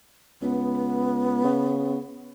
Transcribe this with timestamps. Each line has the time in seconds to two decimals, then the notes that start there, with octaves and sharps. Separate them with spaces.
0.42 C#2 B3
1.44 C#3